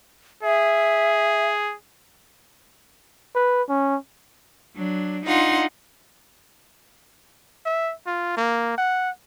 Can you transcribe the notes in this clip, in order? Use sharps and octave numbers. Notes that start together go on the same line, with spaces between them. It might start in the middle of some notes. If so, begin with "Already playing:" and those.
G#4 E5
B4
C#4
F#3 D4
D4 D#4 F4 F#5 C6
E5
F4
A#3
F#5